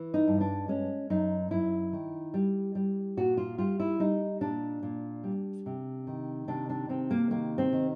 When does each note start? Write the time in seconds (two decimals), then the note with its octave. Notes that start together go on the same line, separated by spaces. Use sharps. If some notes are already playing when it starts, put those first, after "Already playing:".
Already playing: E3
0.14 D#4
0.27 G2
0.40 D4
0.68 G#3 C#4
1.10 F#2 D#4
1.51 F#2 E4
1.93 D#3
2.34 G3
2.75 G3
3.17 A#2 F#4
3.37 F4
3.58 G3 F4
3.80 E4
3.99 G3 D#4
4.41 A#2 D4
4.83 A#2
5.23 G3
5.66 C3
6.07 D#3
6.48 C3 D4
6.69 D4
6.89 C3 C4
7.11 A#3
7.30 D#3 A#3
7.58 C4
7.73 D#3